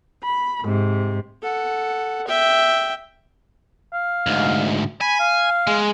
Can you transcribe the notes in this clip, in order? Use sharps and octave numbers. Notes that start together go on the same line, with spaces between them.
B5
G#2 C3
A4 F#5
E5 G5
F5
D2 G#2
G#5 B5
F5
G#3